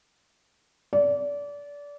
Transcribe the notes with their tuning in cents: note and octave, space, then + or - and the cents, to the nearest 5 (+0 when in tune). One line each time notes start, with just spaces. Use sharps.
D5 -25